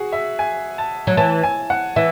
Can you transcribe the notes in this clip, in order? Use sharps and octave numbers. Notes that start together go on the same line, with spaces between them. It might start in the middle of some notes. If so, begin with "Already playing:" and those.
Already playing: F#4 G#4
E5
G#5
A5
F#3
E3 A5
G#5
F#5
E3 E5